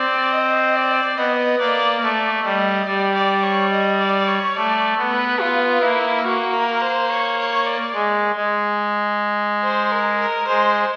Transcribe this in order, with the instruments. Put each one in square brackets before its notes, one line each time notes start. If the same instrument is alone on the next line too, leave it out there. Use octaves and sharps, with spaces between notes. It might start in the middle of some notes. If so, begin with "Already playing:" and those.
Already playing: [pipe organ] C4 [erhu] D5
[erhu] D#5
D5
[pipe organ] B3 [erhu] D#5
[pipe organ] A#3 [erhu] D5
[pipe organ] A3 [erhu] D5
[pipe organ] G3 [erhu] D#5
[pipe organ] G3 [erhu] D5
[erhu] D5
C#5
D#5
D5
C#5
[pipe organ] A3 [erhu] D5
[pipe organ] B3
[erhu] B4
[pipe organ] B3 [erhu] F4
[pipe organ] A#3 [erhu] E4
[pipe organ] A#3 [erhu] F#4
[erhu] A#4
C5
C#5
C#5
D5
[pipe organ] G#3
G#3
[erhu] C5
A#4
A#4
[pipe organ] G#3 [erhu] C5